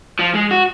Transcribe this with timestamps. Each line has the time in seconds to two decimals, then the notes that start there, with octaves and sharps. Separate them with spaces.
0.19 F3
0.35 G#3
0.51 F#4